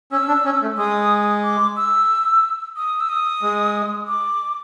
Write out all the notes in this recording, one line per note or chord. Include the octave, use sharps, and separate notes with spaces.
C#4 E6
D4
C#4
A3
G#3 D#6
D6
E6
D#6
E6
D#6
G#3
D6